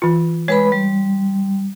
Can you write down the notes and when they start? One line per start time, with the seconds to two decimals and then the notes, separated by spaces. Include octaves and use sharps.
0.02 E3 F4
0.48 G#3 B4 C#5 B5
0.72 G3